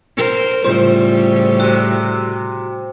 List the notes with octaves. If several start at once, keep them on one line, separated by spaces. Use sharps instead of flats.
A#4 C5
A2 C#3 G3 F4 C5
C3 F#4